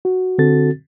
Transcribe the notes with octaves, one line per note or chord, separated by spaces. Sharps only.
F#4
D3 C4 F#4 A4 A6